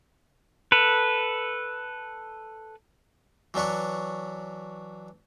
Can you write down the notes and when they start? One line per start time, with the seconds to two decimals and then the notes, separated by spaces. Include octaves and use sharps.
0.72 A4 B4
3.54 E3 F#3 D4 B4 C#5